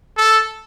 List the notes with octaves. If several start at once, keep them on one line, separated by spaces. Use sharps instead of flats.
A4